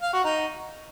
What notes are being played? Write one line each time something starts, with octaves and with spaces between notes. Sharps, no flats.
F5
F#4
D#4